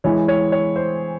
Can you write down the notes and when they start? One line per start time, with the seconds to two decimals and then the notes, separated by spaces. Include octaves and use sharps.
0.04 E3 G#3 E4 C#5
0.28 C#5
0.52 C#5
0.76 C5